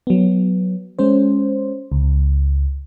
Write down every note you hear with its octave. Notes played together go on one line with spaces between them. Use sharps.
F#3 B3
G#3 C#4 C5
C#2